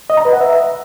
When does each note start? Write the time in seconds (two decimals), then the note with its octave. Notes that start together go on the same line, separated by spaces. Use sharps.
0.10 D#5
0.17 A#5
0.25 B4
0.33 F#5
0.41 E5